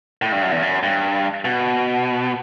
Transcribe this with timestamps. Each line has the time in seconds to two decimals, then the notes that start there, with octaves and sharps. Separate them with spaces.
0.22 A2
0.32 G2
0.42 F#2
0.51 E2
0.62 F#2
0.83 G2
1.45 B2